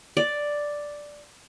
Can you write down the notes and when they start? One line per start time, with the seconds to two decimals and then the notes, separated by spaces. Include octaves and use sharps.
0.17 D5